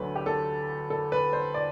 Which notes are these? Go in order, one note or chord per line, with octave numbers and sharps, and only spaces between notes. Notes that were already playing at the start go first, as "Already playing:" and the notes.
Already playing: D2 D3 F#3 A3 B4
G4
A4
A4
B4
C5
D5